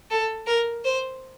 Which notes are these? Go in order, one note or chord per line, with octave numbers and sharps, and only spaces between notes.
A4
A#4
C5